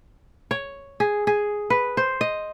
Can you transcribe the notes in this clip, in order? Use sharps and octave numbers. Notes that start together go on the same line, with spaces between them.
C#5
G#4
G#4
B4
C5
D#5